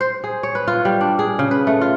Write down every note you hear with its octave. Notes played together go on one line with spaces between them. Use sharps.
C5
G#4
C#5
B4
F4
G3
D4
G#4
C#3
B4
A3
F4